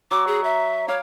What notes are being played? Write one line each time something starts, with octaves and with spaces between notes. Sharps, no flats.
F#3 D6
G#4
E5
C#5 F5 D6